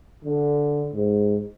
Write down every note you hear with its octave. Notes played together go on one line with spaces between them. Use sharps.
D3
G#2